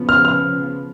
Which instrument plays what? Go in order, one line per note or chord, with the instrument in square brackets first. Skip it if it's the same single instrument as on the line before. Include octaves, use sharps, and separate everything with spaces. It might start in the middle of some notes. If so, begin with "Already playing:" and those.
Already playing: [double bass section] C#3 F3 B3
[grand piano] F6
F6